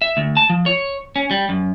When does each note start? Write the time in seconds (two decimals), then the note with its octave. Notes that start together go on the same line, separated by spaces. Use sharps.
0.02 E5
0.17 D2
0.37 A5
0.50 F3
0.66 C#5
1.16 C#4
1.31 G3
1.49 F#2